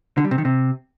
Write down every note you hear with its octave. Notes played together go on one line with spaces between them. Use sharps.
D3
G3
C3
D#3
C3